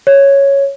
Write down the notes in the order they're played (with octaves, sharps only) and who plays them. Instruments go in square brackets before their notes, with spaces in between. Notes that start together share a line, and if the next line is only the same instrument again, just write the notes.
[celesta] C#5